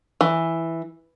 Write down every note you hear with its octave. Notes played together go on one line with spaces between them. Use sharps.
E3